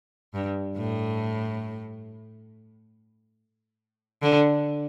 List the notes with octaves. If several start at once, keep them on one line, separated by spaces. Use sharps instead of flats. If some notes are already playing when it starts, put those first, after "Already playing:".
G2
A2
D3